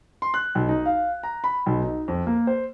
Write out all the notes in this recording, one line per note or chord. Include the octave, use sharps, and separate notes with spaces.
C6
F#6
B1
D#4
F5
A#5
B5
B1
D#4
F2
A#3
C5